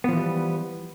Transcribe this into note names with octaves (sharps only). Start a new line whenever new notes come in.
E3 F3 G3 B3